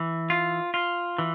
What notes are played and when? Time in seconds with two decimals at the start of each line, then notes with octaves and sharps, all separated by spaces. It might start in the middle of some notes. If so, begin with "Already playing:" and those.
Already playing: E3
0.30 F4
0.74 F4
1.18 E3